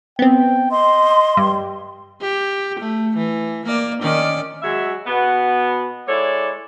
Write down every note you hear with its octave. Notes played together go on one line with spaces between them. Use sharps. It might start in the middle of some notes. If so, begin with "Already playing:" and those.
B3 C4 G5
D#5 C6
G2 G4
G4
A3
E3
A#3 D5
D#3 C#4 D5
F#3 G#3 E5
B2 B3
G#3 E4 A4 C#5 D5